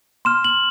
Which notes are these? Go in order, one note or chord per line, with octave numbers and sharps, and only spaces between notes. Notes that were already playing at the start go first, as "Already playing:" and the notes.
C6 F6 E7
F#7